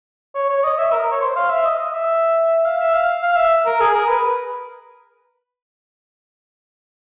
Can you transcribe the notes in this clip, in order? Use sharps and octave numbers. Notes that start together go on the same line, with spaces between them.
C#5
C#5
D#5
E5
A#4
C#5
C5
F5
E5
D#5
D#5
E5
F5
E5
F5
F5
E5
A#4
G#4
A#4
B4